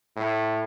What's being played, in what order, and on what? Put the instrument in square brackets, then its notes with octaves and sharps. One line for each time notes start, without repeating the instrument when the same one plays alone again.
[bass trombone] A2